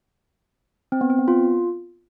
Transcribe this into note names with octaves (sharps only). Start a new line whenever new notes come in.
C4
B3
C4
B3
F4